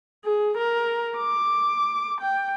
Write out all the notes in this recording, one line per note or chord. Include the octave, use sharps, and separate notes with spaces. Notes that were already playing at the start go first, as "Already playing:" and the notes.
G#4
A#4
D6
G5